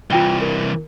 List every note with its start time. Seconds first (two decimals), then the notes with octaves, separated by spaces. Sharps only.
0.10 C2 E3 F4 G5 G7
0.41 A#4